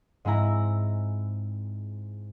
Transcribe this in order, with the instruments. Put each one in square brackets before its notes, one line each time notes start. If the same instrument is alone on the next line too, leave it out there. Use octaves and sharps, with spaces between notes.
[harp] G#2 G#3 C4 E4 A#5